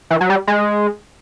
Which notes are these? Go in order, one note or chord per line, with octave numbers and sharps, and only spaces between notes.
E3
F#3
G3
G#3